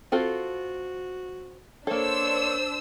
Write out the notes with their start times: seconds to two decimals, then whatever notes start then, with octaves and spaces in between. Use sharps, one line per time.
0.12 C4 F4 F#4 A4
1.87 A#3 D4 A4 C5 C#5 E6